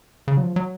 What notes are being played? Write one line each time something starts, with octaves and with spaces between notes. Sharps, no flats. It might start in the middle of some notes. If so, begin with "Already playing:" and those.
C#3
F#3
F3
F#3